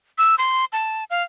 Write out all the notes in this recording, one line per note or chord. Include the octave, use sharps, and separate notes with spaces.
E6
C6
A5
F5